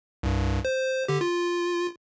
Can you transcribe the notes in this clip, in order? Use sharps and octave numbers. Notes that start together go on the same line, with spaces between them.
C2 G2
C5
D3 G4
F4